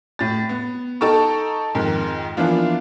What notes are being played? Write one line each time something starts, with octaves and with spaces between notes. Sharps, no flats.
A2 A6
B3
D#4 A4 G5 A5 A#5 C#6
F2 G#2 D#3
E3 F3 A#3 B3 D4 F4